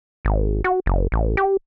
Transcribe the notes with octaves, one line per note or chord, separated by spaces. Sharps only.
G#1
F#4
F#1
A1
G4